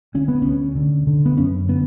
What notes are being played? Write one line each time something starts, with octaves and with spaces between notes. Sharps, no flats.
D3 C#4
B3
D2 C#4
D3
D3
B3
F#2 C#4
D3 B3